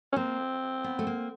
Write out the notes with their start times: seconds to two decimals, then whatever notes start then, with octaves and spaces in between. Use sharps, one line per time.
0.12 C#4
0.16 A#3 C4
0.84 B3
0.99 A3
1.07 A#3